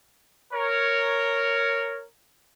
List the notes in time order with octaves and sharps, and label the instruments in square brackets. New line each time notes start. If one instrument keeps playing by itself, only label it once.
[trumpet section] A#4 C#5